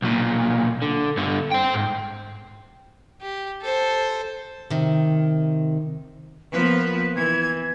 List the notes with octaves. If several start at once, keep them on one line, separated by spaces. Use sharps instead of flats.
B1 A#2
D3
G2 D3
C5 G5
G#2
G4
A4 C5
C3 D#3
F3 A#3 B3 B4
E3 G#6